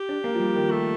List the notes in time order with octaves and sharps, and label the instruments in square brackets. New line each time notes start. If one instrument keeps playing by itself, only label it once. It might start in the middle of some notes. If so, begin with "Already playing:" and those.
Already playing: [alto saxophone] G4
[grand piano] D4
A#3
F3
G3
D#3
[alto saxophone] A3